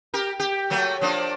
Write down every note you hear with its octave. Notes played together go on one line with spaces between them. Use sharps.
G4 A#4
G4
F#3 A3 A#3
F3 A#3 D4